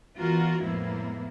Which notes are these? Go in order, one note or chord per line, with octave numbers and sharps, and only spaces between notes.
E3 G3 B3 F4 F#4 A#4
F2 A2 G#3 A#3 B3 E4